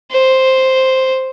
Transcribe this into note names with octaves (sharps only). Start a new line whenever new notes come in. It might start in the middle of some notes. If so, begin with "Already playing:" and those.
C5